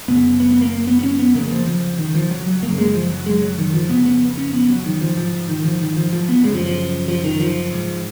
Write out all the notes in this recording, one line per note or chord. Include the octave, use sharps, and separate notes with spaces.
F#2 C#3 B3
B3
B3
A#3
B3
B3
C#4
B3
F2 C#3 A#3
F3
F3
D#3
F3
F#3
F#3
F#2 C#3 A#3
G#3
F3
F#3
G#3
F#3
D#3
F3
F2 C#3 B3
B3
C#4
B3
F#3
D#3
F3
G#2 F3
D#3
F3
D#3
F3
F3
B3
F#2 C#3 G#3
F3
F3
F3
D#3
F3
G#2